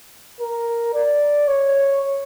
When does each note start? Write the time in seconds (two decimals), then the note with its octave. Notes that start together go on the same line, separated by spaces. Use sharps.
0.41 A#4
0.94 D5
1.48 C#5